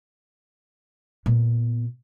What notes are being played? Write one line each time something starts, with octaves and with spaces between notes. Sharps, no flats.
A#2 B3